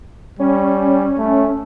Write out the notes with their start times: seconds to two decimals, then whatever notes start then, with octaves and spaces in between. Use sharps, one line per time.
0.39 G3 C#4
1.18 A3